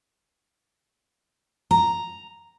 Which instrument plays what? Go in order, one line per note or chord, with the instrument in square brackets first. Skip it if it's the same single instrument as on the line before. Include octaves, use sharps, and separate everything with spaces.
[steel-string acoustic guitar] A#5